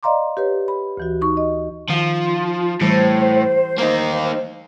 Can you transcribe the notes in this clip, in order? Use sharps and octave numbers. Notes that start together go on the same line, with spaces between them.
D5 D#5 F5 A#5 C6 D6
G4 B4 C#5
B5
D2 E3 F#4
D#4 C#6
D#5
D#3 F3
A2 E3 G3 A3 C5
A#3 D#4